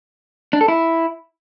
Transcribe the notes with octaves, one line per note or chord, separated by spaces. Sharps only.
D4
A4
E4